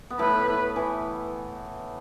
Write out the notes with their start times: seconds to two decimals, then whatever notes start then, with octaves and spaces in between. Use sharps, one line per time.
0.10 B3
0.19 A2 A3 B4
0.76 E3